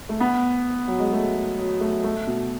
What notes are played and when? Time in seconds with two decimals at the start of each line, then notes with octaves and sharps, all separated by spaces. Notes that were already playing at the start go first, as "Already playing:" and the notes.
0.09 A3
0.20 B3
0.88 F#3
0.99 G#3
1.13 A3
1.59 F#3
1.81 A3
2.04 A3
2.27 B2